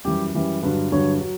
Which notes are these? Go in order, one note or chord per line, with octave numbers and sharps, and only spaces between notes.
F#2 E3 G3 G4
F#2 E3 G3
G2 D3 F#3 B4
G2 D3 F#3 C#5
F#3